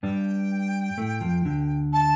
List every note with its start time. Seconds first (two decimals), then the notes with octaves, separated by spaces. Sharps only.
0.03 G2 G3 G5
0.98 A2 A3
1.21 F2 F3
1.45 D2 D3
1.93 A5